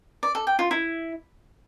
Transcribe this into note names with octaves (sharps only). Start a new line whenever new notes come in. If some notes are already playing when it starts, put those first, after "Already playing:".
D5
A4
G5
F4
E4